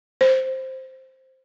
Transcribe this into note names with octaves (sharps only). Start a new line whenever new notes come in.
C5